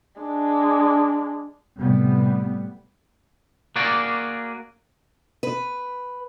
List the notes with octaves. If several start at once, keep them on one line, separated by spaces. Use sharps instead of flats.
G#3 D4
A2 C3 G3 B3
A#3 F#4 G#4 D5
B4